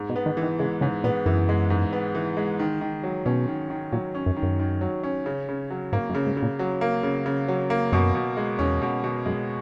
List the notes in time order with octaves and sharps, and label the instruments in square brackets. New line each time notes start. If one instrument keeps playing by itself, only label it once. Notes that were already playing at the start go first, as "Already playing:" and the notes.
Already playing: [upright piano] G#2
[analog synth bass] B2
[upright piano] B3
[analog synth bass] D#3
[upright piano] E3
[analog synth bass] D#3
[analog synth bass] C#3 [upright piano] G#3
[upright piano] G#2 [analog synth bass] C#3
[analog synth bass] A#2 [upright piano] B3
[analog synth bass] F#2 [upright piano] E3
[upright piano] G#3
G#2
B3
E3
G#3
D#3
D#3
F#3
[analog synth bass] B2 [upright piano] C#4
[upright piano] D#3
D#3
[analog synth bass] A#2 [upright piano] F#3
[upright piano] C#4
[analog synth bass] F#2
[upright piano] D#3
[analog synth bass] F#2
[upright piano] D#3
F#3
C#4
C#3
C#3
F#3
[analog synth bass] G#2 [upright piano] A#3
[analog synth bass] F#2
[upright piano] C#3
[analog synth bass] G#2
[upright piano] C#3
[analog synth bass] A#2
[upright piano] F#3
A#3
C#3
C#3
F#3
A#3
[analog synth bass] F#2 [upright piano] B2
[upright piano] B2
G#3
[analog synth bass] E2 [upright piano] C#4
[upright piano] B2
B2
[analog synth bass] F#2 [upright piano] G#3